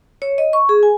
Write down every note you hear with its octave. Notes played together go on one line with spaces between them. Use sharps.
C#5
D#5
C#6
G#4
G#5